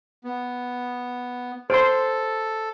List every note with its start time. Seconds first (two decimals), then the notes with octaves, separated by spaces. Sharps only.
0.24 B3
1.70 A4 C5 C6